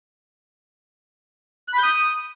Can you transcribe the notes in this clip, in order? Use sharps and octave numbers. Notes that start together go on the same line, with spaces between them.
F#6
B5
G6
D#6